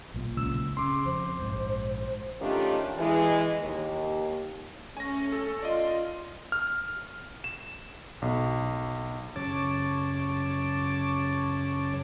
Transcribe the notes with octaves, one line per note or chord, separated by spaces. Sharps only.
B1 A#2
C#2 E6
C#3 C6 D6
F2 C5
A#1 G#2
D#3 A3 C#4 D4 F4 G4
E3 G#3
D#2
A3 C#4 G#5 A#6
A4
F4 D5 D#5
F6
E7
B1
F#2 C#3 C#5 A5 D6